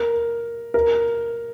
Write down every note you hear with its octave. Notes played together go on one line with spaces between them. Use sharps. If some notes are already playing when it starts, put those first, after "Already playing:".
Already playing: A#4
A#4